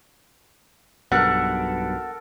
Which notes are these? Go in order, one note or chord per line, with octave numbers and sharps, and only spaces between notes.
B1 G2 B2 A4 A#4 F#5 F#6